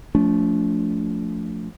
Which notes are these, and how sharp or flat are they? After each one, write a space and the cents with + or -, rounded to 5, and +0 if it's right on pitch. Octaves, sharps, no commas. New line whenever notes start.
F3 +0 A3 +0 D4 -40